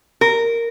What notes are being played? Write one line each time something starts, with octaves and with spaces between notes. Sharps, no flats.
A#4